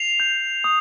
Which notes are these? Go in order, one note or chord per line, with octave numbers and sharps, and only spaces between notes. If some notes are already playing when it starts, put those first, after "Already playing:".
Already playing: C7 F7
G6
D#6